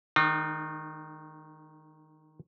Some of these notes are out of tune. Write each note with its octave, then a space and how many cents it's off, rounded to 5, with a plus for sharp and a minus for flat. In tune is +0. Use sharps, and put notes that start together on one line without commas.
D#3 +0 G#3 +40 D#4 -45